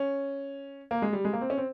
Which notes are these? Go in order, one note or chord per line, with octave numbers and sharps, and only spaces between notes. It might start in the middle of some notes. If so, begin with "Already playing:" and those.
Already playing: C#4
A#3
G#3
G3
G#3
A#3
C4
C#4
C4